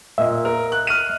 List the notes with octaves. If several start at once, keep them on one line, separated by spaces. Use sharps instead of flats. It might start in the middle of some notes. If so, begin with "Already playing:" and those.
A#2 D#5 E5
A#4
F#6
F6 D#7